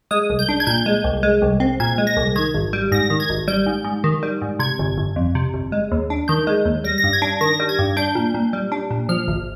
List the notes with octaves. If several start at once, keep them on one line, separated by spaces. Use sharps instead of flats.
G#3 D#6
C2
G6
D4
G#6
A#2 G6
G#3
C2
G#3
C2
C4
A#2 G#6
G#3
A#6
C2
D#3 G#6
G#1
G3
G#2 A#6
D#3
G#6
G#1
G3 G6
G#2
G#2
D#3
G3
G#2
C3 G#6
G1
G1
F2
C3
G1
G#3
D#2
D4
D#3 G6
G#3
D#2
G3 A#6
A#6
G2
G#6
D4
D#3 A#6
G3
G#6
G2
D4 G6
A#2
A#2
G3
D4
A#2
F3 F6
G#1